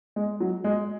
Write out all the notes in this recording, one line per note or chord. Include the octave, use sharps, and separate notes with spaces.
G#3
F#3
G#3